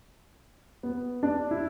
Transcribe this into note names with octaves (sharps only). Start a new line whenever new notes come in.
B3
D4
E4